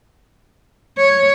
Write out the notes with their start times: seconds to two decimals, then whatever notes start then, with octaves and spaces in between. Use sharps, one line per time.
0.97 C#5